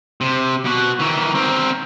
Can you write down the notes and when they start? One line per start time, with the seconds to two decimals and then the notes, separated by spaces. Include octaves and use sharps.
0.21 C3
0.65 B2 F#4
0.99 D#3 E3
1.35 C4 A#4